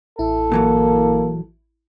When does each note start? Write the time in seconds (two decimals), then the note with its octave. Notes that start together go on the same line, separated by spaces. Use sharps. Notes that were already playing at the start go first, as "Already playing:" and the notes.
0.19 A1 E4 A4
0.52 A#2 E3 F#3 A#3